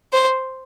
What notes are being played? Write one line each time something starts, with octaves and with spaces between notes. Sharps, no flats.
C5